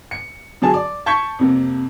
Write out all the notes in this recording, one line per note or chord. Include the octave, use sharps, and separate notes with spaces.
C#7
D3 F#3 G#4 A5
D5
A5 C#6 G6 G#6 B6 C#7
F2 C3 A#3